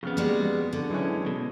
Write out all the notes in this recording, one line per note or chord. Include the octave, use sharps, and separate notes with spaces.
F2 C#3 B3 F6
G3 G#3 A#3 F#4
D3
E3 F#3 G#3 C#4
B2